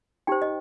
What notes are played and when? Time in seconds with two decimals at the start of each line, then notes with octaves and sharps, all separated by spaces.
0.27 D#4 G4 C5 G5
0.42 D#5